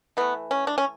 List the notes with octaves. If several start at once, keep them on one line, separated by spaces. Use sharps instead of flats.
E3 A3 B3
C#4
D4
C#4